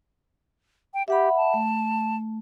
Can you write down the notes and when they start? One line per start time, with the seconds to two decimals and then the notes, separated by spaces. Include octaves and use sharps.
0.94 G5
1.08 G4 E5 F#5 B5
1.37 A5
1.54 A3